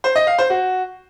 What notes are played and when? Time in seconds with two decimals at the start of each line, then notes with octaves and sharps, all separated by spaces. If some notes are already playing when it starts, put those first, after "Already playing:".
0.04 C5
0.16 D#5
0.27 F5
0.38 C5
0.50 F#4